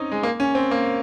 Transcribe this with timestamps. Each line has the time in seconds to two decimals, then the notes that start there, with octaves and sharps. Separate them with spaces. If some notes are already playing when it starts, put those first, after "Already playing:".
Already playing: C4 C#4 D#4
0.12 G#3
0.23 A#3
0.40 C#4
0.55 C4
0.71 A#3